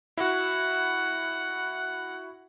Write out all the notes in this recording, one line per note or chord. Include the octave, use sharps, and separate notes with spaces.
E4 F#4 F#5